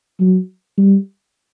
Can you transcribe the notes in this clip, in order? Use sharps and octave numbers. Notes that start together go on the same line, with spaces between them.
F#3
G3